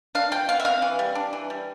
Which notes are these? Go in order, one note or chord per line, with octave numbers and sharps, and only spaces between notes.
D4 F5
F3 G5
B3 F5
E5
C4 F5
E3
G3
D4
E3
G3